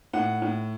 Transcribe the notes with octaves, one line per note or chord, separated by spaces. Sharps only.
A2 F#5
A2